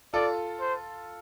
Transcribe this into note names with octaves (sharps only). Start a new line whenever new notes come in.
F4 A4 D5
C5